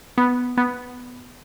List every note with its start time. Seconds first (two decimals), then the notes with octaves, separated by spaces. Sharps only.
0.18 B3
0.57 B3